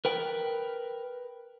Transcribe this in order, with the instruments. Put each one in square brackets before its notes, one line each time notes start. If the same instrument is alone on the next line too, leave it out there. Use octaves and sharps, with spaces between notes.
[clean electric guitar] A#4 B4 G5